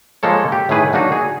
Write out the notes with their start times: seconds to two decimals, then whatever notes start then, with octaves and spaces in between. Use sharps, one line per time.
0.23 F3 G#3 A#3 A4 C#5
0.52 G4
0.69 A2 D#3 A3 G#4 B4
0.93 F#3 A#3 D4 D#4 F#4
1.12 G#4